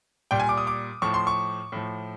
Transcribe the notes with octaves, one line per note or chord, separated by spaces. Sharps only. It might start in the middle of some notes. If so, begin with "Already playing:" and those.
A#2 G3 G5
G#5
D6
D#6
D6
A2 F3 C#6
C6
C#6
A2 F3